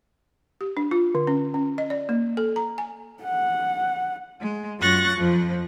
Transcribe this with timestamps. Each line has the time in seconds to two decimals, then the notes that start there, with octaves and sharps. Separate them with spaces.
0.61 G4
0.77 D4
0.91 F4
1.15 D3
1.27 C#4
1.54 C#4
1.78 D#5
1.90 D5
2.09 A#3
2.37 A4
2.56 A#5
2.78 G#5
3.24 F#5
4.41 G#3
4.80 F#2 F4 C#6 F#6 A6 A#6
5.17 F2 F3